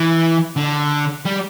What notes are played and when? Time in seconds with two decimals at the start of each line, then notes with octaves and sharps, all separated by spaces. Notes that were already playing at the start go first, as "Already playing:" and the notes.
Already playing: E3
0.57 D3
1.25 G3